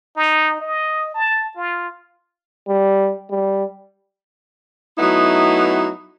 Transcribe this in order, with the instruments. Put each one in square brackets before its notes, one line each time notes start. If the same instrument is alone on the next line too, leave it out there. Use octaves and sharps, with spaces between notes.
[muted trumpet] D#4
D#5
A5
F4
[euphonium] G3
G3
[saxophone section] F#3 A3 B3 D#4 E4